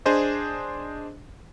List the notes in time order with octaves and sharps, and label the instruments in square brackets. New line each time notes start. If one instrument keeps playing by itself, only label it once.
[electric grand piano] D4 G#4 C5 D#5